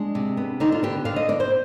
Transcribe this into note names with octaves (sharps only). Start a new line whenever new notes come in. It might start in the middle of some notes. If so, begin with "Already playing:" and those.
Already playing: G#3 D4
C3
B3
D3 D#4
F4
B3 G4
D3 F5
D#5
B3 D5
C5